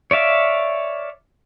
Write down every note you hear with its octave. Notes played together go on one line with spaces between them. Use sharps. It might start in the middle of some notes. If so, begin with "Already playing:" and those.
C#5 D5 E5 F5